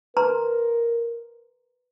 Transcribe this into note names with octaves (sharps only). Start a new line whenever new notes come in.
A#4 B4 A#5 C6